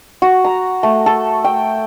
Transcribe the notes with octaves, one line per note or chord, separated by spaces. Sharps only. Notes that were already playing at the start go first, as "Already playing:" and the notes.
F#4
A#5
A3
A4
G5